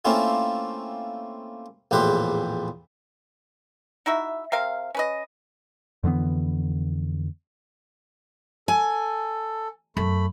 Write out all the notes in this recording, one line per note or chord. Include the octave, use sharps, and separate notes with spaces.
A3 A#3 C4 C#4 E4 F4
A#1 E2 A2 G4 B4 C5
D#4 E4 F#4 E5
C3 A#4 F5
C#4 B4 D#5
F2 D3 E3 B3
A4 G#5
F#2 A3 B5